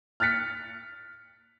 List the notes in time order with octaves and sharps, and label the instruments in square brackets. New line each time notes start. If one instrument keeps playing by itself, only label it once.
[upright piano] F6 F#6 A6 B6 C#7